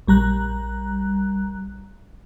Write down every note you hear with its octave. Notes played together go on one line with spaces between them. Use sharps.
A#1 G3 A#5 F#6